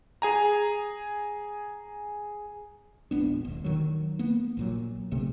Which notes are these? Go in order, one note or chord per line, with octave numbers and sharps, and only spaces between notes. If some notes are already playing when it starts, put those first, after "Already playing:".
G#4 G#5 A#5
E1 A#1 B3 D4
D#1
D#3 F#3
A#3 B3
A#1 A#2 F#3
B1 C3 A3